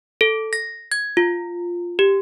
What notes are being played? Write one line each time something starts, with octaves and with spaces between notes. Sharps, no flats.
A4
A#6
G#6
F4
G4